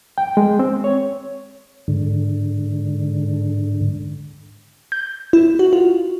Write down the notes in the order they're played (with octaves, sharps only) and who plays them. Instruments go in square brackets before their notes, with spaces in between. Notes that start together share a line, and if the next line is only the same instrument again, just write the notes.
[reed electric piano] G5
G#3
C4
C#5
[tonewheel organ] G#2 D3
[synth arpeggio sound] G6
E4
F#4
F4